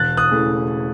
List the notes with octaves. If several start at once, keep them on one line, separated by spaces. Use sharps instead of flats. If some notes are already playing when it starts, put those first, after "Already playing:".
Already playing: E1 F#6 A6
D#6 F#6
C#3 E3 A3